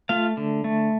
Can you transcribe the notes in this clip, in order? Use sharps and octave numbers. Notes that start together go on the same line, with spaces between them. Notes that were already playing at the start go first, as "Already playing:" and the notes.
A3 F4 F5
D3
A3